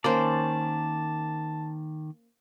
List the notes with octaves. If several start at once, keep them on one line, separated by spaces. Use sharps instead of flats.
D#3 A#3 C#4 C5 D5 A5